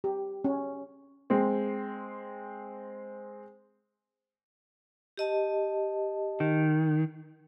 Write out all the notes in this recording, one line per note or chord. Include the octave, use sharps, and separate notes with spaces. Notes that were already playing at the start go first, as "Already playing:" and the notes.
G4
C#4
G#3 C4
G4 D#5 A5
D#3